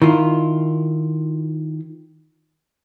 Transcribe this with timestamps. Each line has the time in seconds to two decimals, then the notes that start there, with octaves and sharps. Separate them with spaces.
0.02 D#3 E4 F4